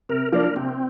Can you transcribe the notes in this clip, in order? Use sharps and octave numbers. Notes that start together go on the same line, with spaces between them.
C3 A#4
F3 A#3 D4 A#4
C3 C4